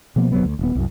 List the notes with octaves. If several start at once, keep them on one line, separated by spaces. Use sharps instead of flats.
B2 F3 A#3 B3
F#1 C3 F#3 B3
D2
D#1 B3
C2 F#2